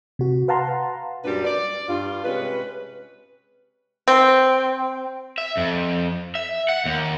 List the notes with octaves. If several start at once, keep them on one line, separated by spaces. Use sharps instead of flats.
C3 F#4
B4 F5 F#5 A5 A#5 C6
F#2 A#2 F#3 G3 D4 B4
D5
G2 F4
C3 G#3 C#4 B4
C4
E5
F2
E5
F#5
D#2